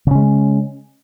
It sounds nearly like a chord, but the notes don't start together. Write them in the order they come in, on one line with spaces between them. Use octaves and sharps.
C#3 C#4 G#3